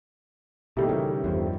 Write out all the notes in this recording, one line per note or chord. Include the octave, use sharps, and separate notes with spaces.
B2 D#3 G3 A3 A#3 E4 G4 A4
C#3 E3
E2 G2 F3